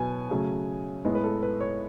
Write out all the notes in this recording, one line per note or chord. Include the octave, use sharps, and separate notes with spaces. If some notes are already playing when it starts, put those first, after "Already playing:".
Already playing: B2 F#3 B3 G#5
C#3 F#3 A3
A2 G#3 B3
B4
A4
B4
C#5